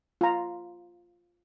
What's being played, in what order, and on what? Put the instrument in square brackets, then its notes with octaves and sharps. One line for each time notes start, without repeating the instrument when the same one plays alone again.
[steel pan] F4 A#5